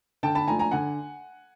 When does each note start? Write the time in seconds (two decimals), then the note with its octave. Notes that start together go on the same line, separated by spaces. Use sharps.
0.23 D3 G5 A5
0.35 A5 B5
0.48 F3 A3 D4 G#5 A#5
0.59 G#5 A#5
0.71 D3 F#5 G#5